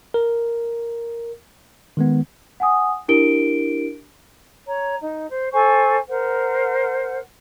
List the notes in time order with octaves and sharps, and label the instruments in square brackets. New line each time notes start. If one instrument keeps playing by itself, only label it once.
[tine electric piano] A#4
D#3 G#3 B3
[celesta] F#5 G#5 D#6
D4 E4 G4 A#4 D7 G7
[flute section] C#5 A#5
D#4
C5
A4 C5 G#5 C#6
A#4 C5 F#5